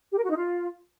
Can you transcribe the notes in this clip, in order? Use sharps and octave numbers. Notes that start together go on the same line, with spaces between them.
G4
A#4
F#4
D#4
F4